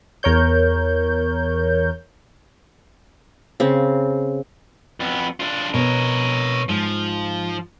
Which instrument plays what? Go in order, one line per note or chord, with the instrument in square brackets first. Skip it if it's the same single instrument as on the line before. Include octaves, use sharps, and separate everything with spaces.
[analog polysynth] E2 A#4 C#5 G6
[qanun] C#3 C4
[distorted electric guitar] F2 B3
D4 F4
[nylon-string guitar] B2 B4 [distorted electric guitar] A#4 C#5
[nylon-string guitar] G#2 [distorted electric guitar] F3